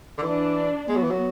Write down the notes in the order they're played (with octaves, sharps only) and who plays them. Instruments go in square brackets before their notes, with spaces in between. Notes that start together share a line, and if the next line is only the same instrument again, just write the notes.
[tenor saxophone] D3
[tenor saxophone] E3 [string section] D4
[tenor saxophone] G#3 [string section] B3
[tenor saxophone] F#3
E3
F#3